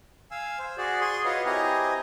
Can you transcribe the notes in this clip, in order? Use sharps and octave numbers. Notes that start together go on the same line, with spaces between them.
F5 G#5 E6
C5
F#4 G#4 D5
G#4 G#5 C6
F4 F#4 B4 C#5 D#5
C4 E4 G4 D#5 G#5 A#5